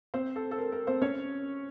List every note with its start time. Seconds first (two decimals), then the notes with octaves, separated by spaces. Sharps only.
0.14 C4 C5
0.36 A4
0.51 A4
0.58 A#4
0.72 A#4
0.87 C4 C5
1.02 C#4 C#5